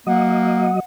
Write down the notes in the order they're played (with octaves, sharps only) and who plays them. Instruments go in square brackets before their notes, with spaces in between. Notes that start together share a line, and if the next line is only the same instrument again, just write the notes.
[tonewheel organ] F#3 D#5 [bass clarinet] A#3 [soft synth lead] F#5